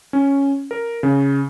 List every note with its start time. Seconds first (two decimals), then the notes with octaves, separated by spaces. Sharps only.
0.13 C#4
0.71 A#4
1.03 C#3